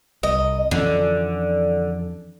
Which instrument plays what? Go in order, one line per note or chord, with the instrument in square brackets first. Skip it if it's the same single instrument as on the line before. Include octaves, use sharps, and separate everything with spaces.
[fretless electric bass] C2 [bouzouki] D#5
[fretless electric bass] F2 E3 C#4 [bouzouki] D3